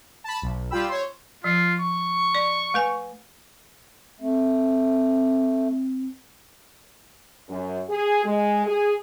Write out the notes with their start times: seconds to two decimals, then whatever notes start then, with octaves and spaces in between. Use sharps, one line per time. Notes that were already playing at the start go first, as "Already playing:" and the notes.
0.24 A5 B5
0.42 B1
0.71 G3 F4 G4 G5 B5 E6
0.89 C5 C#5
1.44 F3 F4
1.80 C#6
2.35 D5
2.74 A3 B4 G#5
4.20 A3 C4
7.48 F#2
7.89 G#4
8.24 G#3
8.66 G#4